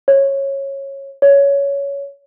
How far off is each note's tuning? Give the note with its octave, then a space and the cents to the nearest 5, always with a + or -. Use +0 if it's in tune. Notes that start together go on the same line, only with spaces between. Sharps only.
C#5 -15
C#5 +15